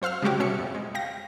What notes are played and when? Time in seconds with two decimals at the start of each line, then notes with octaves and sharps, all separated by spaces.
0.02 F#2 C5 F5 E6 F6
0.22 C#3 G3 G#3 F#4 G4
0.40 B2 C#4 E5 C#7
0.59 F2
0.75 G#3
0.94 F5 G5 A#6